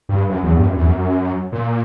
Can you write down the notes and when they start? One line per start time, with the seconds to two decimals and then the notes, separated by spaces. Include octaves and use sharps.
0.09 G2
0.29 F#2
0.43 E2
0.57 G2
0.66 F#2
0.76 E2
0.85 F#2
1.52 A#2